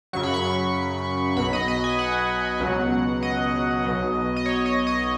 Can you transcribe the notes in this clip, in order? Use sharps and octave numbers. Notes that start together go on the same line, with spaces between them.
F#2 C#3 F#3 C#6
B5
C#6
B1 B2 F#3 B5
D#5
D#5
G#5
F#5
C#2 B2 F#3
D#5
B1 B2 F#3
D#5
C#5
D#5
D#5